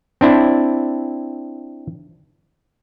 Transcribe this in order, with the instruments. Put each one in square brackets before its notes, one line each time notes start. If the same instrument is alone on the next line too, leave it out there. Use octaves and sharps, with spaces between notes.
[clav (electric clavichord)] C4 D4 E4